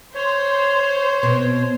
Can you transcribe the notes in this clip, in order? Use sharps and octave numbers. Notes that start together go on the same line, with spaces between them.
C5 C#5
B2 B3 C4